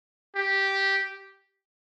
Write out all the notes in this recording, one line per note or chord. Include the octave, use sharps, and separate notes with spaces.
G4